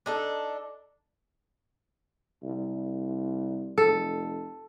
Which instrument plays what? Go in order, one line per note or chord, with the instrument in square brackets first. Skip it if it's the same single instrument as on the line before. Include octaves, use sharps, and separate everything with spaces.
[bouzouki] D4 D#4 A4
[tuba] C2
[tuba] F1 [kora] A4